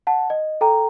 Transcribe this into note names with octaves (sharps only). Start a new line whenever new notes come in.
F#5 A5
D#5
A4 G5 A#5